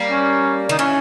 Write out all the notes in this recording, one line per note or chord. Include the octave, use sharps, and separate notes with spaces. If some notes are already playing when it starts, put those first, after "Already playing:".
Already playing: G3 A#3
C#4
D#3 D#4
E3 C#4